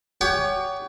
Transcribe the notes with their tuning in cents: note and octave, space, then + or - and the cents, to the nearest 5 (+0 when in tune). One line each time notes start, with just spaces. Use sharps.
G4 +40 C#5 +30 F#5 +35